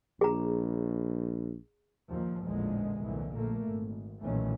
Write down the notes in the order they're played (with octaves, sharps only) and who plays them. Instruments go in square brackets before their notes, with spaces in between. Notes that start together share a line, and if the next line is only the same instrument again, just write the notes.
[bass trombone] A#1 [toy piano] G#4 A#5
[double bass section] D#2 A#2 F3
A1 E2 A#2 D3 F3 G#3
C2 A#2 D3 E3
A#1 A3 A#3
G#1
B1 A#2 D#3 E3 A3 C#4